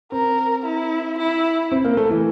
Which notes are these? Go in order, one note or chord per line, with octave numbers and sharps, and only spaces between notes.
C4 A#4
E4
E4
C4
A#3 A#4
A3 A4
E3 E4